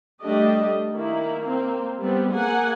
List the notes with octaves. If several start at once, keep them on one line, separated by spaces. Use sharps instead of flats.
G3 A3 D4 G4 D#5
D#3 A#3 E4
A#3 C4
G3 B3 C4
A#3 G#4 F#5 G#5